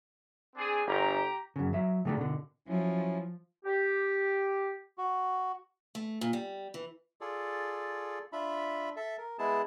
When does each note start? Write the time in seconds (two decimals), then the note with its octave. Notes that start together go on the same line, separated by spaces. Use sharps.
0.55 C4 D4 G#4
0.86 G1 G4 A#5
1.56 F#2 C#3
1.73 F#3 E5
2.05 C#3 G3 A3 D4 A4
2.17 B2 D3
2.68 F3 F#3 C#4 E4
3.65 G4
4.98 F#4
5.95 A3
6.21 A#2
6.33 G3
6.74 E3
7.21 F4 G#4 A4 D5
8.33 D4 F4 E5 B5
8.96 A4 E5
9.18 A#4
9.39 G#3 B3 E4 G#4 A5